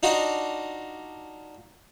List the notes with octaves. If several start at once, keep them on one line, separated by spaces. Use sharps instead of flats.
D4 D#4 F4 F#4 D#5